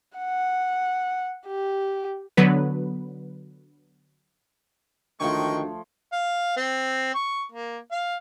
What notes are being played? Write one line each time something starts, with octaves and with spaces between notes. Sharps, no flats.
F#5
G4
D3 F#3 B3 B4
D2 D#3 F3 G#3 A3 C#5 G5 C#6
F5
C4
C#6
A#3
F5